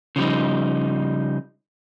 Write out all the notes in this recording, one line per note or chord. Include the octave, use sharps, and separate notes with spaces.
C#3 F3 G3 D#4